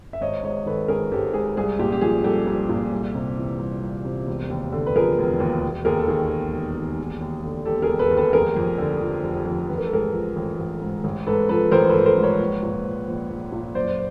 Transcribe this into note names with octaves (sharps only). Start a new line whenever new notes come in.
E5
G#1 C#5 D#5
G#2 C#5 D#5
D#3 A4 B4
G#1 G#4 A#4
G#1 G4 A4
G#2 G#4
C2 G#4
A#2 G4
G4
F3 G#4
C2 G4 A4
C2
A#2
C2
C3
E3
C2
C2
C3
E1
D#2
D3
B4
F3 G#4 A#4
E1
D#2
E1
D#2 G#4 A#4
A4
D#3 G#4
E1
E1
D#2
E1
D#2
D3
E1 G4 A4
G#4 A#4
E1
A4 B4
D#2
A4 B4
F1 G#4 A#4
F2
D3
F3
F1
F2
A1 B4
A#4
A4
G#2 G#4 A#4
F3
A1
A1
G#2
A1
G#2 A4 B4
F3 A4 B4
A1 A#4 C5
A4 B4
A1
A#4 C5
G#2
B4 C#5
A#1
A#2
F3
A#1
A#1
A#2
F#1 C5 D5